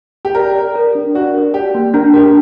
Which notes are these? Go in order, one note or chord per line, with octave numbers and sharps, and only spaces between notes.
G4
A#4 D5
D5
A#4
D4
F#4 D5
A#4
G4 D5
A#3
D4 A#4
G4 A#4